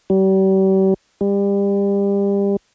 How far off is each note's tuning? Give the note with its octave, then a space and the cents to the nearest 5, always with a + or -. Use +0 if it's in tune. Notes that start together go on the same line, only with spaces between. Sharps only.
G3 -40
G3 +30